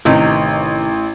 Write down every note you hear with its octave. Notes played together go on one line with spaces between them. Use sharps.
A1 C3 D#3